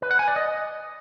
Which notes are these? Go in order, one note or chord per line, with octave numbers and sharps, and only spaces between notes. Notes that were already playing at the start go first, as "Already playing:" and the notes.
B4
F#5
G#5
D5
D#5